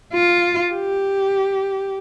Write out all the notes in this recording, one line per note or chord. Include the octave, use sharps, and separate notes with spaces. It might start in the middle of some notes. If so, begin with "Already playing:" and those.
F4
G4